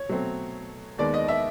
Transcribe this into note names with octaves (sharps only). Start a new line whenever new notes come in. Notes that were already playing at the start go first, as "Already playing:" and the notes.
Already playing: C#5
B2 F#3 A3 C4
D#2 D#3 G#3 B3 D5
D#5
E5